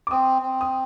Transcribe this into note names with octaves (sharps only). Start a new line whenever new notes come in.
D6
C4 D#6
C4
D#6